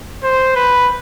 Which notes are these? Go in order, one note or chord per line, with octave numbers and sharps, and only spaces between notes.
C5
B4